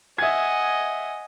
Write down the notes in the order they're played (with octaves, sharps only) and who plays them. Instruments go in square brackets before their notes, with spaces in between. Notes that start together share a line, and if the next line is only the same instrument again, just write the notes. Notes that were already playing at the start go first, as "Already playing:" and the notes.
[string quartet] D#5 F#5 G#5 [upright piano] E5 G#6